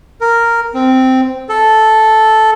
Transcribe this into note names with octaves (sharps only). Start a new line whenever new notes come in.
A#4
C4
A4